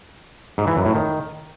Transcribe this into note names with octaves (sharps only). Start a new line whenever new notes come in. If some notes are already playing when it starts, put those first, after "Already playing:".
G#2
E3
F#2
A2
D#3